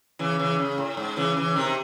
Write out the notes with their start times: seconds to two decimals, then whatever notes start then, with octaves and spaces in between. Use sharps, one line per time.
0.19 C#3 E3
0.39 C#3 E3
0.59 C#3
0.78 A2
0.97 G#2
1.17 C#3 E3
1.36 C#3 E3
1.56 C3 D#3